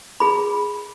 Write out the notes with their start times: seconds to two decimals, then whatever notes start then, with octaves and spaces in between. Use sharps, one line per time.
0.20 G#4 B5